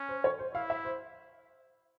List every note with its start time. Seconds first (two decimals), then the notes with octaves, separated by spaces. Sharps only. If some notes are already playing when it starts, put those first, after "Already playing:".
Already playing: C#4
0.09 C5
0.24 C#5
0.39 C5
0.55 E4 F5
0.70 E5
0.85 C5